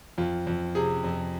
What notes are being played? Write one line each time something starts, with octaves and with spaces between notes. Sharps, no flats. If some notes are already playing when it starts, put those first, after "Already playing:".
F2 F4
F2
C3 G#4
F2